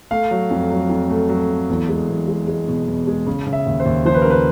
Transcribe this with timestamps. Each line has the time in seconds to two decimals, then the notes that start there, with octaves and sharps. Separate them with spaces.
0.11 A3 F5
0.31 F#3
0.50 F2
0.70 F#3
0.90 F2
1.10 A3
1.29 F#3
1.49 A3
1.70 E2
1.89 G#3
2.09 E2
2.28 G#3
2.48 G#3
2.68 B2
2.87 E2
3.07 G#3
3.27 C#3
3.47 C#3
3.53 E5
3.67 D#2
3.80 C5
3.86 D#2
4.05 F3 C5
4.14 B4
4.22 A#4
4.25 C#3
4.30 B4